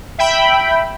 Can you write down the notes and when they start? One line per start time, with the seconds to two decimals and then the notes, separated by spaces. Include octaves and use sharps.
0.19 E5 G5 B5